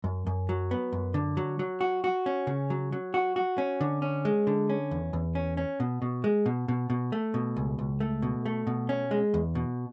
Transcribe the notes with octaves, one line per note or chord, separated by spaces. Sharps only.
F#2
F#2
F#3
B3
F#2
D3
F#3
F#3
F#4
F#4
C#4
C#3
F#3
F#3
F#4
F#4
C#4
D3
C#4
G#3
D3
C#4
E2
E2
C#4
C#4
B2
B2
G#3
B2
B2
B2
A3
B2
C#2
C#2
A3
B2
A3
B2
C#4
G#3
E2
B2